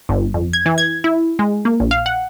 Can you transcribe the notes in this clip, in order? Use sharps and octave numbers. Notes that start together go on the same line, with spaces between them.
G1
F2
G#6
E3
G#6
E4
G#3
A#3
A#1
F5
F#5